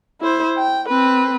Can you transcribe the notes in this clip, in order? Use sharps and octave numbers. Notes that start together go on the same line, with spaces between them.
E4 C5
G5
C4 B4